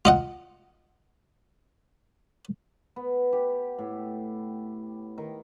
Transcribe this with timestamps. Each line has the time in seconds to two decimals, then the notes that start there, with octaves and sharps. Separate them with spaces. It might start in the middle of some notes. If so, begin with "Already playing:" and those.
0.05 F4 D#5 F#5
2.96 B3
3.33 G4
3.78 A2
5.18 D#3